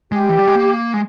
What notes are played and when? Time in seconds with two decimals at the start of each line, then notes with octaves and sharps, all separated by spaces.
0.12 G#3 G4
0.29 E3
0.38 G3
0.47 G#3
0.55 A#3
0.94 G#3